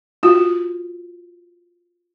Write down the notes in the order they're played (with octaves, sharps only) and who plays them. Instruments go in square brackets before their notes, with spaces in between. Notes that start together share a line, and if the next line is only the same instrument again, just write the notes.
[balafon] F4 F#4